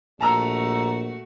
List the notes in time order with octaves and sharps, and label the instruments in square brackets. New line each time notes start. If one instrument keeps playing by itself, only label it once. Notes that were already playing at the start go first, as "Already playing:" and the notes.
[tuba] A#1 [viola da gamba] A3 F#4 [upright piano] A5 A#5 E6